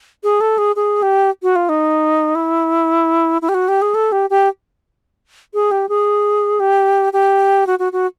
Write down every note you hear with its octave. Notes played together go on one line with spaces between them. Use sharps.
G#4
A4
G#4
G#4
G4
F#4
F4
D#4
E4
E4
G4
F#4
G4
G#4
A4
G4
G4
G#4
G4
G#4
G4
G4
F#4
F#4
F#4